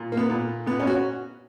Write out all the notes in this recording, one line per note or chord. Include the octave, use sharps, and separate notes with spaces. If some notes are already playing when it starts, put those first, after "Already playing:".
Already playing: A#2
A#3
B3
A#2
A#2 B3
C#4
F#4